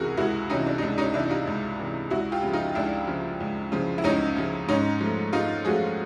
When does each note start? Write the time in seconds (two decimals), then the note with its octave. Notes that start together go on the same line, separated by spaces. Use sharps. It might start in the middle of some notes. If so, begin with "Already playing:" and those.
Already playing: C#2 C3 E3 F#4 G#4 A#4
0.17 C#2 E4 F#4
0.50 C3 E3 C#4 D#4
0.66 D4
0.78 D#4
0.82 C#2 D4
0.98 C#4 D#4
1.14 C3 E3 D4 E4
1.30 D#4 F4
1.47 C#2
1.79 C3 E3
2.10 C#2 E4 F#4
2.32 F4 G4
2.43 C#3 F3
2.53 D#4 F4
2.75 C#2 D4 E4
3.07 C#3 F3
3.40 C#2
3.72 C#3 F3
3.98 E4
4.04 C#2 C#4 D#4
4.37 C#3 F3
4.68 G#2 C#4 D#4
5.01 F3 A3
5.33 G#2 D#4 F4
5.65 F3 A3 F#4 G#4